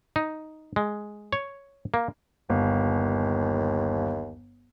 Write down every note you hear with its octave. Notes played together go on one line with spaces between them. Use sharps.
D#4
G#3
C#5
A#3
G1 D#2